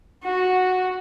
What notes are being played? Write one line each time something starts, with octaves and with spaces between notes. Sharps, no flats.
F#4